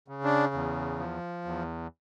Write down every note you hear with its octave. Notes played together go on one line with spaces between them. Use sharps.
C#3
D4
E2
F3
E2